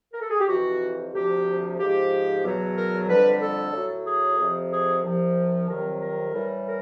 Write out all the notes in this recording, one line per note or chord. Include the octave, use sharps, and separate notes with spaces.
A#4
A4
G#4
G4
F2 C3 E3 F#4
D2 C3 F3 G4
G#2 F3 G4
E2 B2 F#3
A#4
F2 D3 G3 B4
A4
A2 F#3
G#4
F2 C3 F3
G#4
C2 C3 F3
F2 C3 D#3 F#3 A#4
A#4
A2 E3 G3
A#4